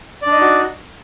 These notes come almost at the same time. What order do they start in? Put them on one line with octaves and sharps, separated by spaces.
D5 D4 D#5 D#4 F#4